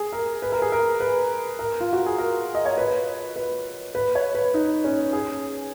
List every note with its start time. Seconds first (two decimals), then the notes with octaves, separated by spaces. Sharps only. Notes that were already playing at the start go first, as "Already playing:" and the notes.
Already playing: G#4
0.13 A#4
0.42 B4
0.52 A#4
0.62 G#4
0.72 A#4
1.00 B4
1.59 A#4
1.80 F4
1.93 F#4
2.06 G#4
2.18 A#4
2.55 D#5
2.65 C#5
2.78 B4
3.36 B4
3.95 B4
4.15 C#5
4.35 B4
4.54 D#4
4.84 C#4
5.13 G#4